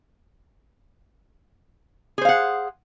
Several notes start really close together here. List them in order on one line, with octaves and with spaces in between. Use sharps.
G#4 C5 F5 F#5